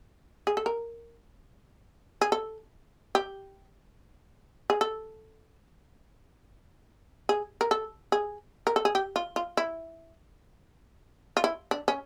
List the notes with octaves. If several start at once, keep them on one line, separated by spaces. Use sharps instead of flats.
G#4
A4
A#4
G#4
A4
G4
G#4
A4
G#4
A#4
A4
G#4
A#4
A4
G#4
G4
F4
F4
E4
F4
E4
D4
C#4